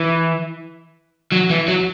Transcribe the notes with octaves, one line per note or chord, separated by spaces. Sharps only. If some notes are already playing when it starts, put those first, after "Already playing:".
Already playing: E3
F#3
E3
F#3